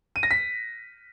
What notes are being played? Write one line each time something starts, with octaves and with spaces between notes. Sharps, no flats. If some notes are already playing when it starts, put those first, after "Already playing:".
D#7
A#6
B6